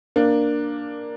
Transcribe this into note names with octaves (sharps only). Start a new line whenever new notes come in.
A#3 D4